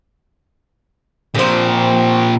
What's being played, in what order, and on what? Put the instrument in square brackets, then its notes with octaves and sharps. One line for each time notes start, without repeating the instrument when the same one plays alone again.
[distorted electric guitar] A#2 F3 [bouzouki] C4 G4